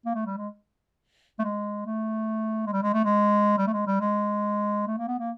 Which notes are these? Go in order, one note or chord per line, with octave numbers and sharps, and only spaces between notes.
A#3
A3
G3
G#3
A3
G#3
A3
G#3
G3
G#3
A3
G#3
G3
A3
G#3
G3
G#3
A3
A#3
B3
A#3